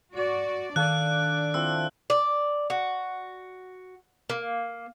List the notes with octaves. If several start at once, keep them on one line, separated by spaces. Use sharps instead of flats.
F#4 D5
D#3 D4 A4 D5 F5 F#6
F3 C4 E4 E6
D5
F#4
A#3